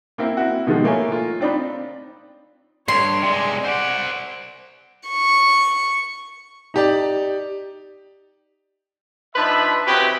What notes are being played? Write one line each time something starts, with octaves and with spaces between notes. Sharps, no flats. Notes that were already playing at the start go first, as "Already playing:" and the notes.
A#3 C4 E4
C4 E4 F#4
B2 D#3 F3 G#3
A3 A#3 E4 C#5 G#5
F4
C4 D4 D#4 B5
G2 C#5 C6
C3 G#3 D5 G#5
C5 D5 F#5
C#6
D#4 G4 D5
F3 D4 D#4 B4 E5 B5
C#3 E3 C4 F#4 G4 B4